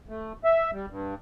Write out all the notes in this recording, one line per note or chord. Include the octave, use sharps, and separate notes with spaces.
A3
E5
G3
G2